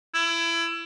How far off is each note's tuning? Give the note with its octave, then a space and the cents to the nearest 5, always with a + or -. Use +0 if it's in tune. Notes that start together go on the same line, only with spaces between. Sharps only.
E4 +25